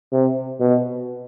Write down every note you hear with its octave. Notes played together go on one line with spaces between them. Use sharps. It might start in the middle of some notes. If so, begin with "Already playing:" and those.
C3
B2